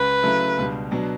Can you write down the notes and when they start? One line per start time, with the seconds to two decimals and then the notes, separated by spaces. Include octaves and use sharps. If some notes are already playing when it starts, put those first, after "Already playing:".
Already playing: C#2 C#4 B4
0.23 C#3 F#3 A3 E4
0.57 C#2 B2 G3 D4
0.91 B2 F#3 B3 D4